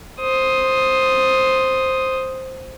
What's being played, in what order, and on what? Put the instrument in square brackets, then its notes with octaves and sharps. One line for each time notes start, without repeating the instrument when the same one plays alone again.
[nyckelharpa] C5 D#6